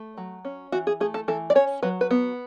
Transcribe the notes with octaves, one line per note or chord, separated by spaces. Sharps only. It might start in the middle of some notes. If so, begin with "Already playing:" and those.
Already playing: A3
F#3
C#4
E3 F#4
G#4
A3 G#4
A4
E3 A4
D5
C#4 C#5
F#3 B4
B4
B3